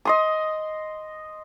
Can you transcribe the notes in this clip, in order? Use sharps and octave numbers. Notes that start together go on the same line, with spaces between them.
D#5 C6 D#6